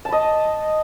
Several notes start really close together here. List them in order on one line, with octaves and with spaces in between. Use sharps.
A5 B5 D#5